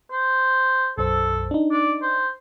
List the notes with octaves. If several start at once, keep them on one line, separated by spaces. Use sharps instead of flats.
C5
B1 F#2 A4 C5
D4 D#4
D5
C5